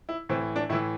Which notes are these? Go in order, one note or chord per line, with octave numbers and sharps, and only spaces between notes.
E4
A2 E3 C4
D4
A2 E3 E4